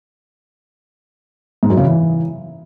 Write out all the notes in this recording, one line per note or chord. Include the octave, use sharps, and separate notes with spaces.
G#2
F#2
C#3
E3